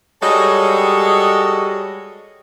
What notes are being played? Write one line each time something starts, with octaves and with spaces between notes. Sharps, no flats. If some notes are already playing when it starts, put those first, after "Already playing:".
G3 G#3 F#4 A4 C#5 D#5